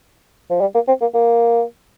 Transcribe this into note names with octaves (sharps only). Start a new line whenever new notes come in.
F3
G3
A#3
C4
A#3
A#3